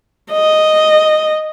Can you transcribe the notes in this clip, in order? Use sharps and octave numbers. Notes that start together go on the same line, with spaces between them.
D#5